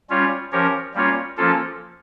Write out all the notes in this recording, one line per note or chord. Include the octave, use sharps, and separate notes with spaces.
G3 C#4 F4 C#5
F3 C#4 G4 A#4 C#5
G3 A#3 C#4 F4 C#5
F3 A#3 C#4 F4 A4